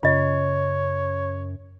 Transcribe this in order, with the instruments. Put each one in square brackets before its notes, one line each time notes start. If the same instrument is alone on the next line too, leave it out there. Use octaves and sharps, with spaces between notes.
[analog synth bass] F#2 [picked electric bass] C#3 [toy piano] F4 D#5 [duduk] C#5